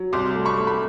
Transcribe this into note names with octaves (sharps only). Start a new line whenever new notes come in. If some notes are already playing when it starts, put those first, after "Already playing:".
Already playing: F#3
C2 C6 D6
A3
B5 C#6
A3
B5